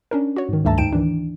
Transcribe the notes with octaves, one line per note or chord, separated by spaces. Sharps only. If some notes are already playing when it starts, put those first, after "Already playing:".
C#4 D4 A#4
F#4 C#5
G#2 D#3
C#2 G2 A3 E5 A5 A#5
D2 G#2 D#4 G5 D7 E7
D#3 E3 D4